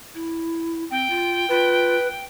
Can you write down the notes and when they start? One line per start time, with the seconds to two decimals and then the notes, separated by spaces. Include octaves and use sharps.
0.14 E4
0.91 C4 G5
1.10 F4
1.49 F4 B4